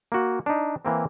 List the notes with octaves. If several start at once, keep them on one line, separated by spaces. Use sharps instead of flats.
A#3 F#4
D4 D#4
E3 A#3 C4